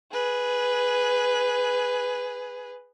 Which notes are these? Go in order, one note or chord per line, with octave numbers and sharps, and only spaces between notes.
G#4 B4